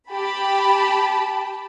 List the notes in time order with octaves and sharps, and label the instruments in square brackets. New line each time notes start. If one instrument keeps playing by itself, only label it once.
[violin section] G4 A5 B5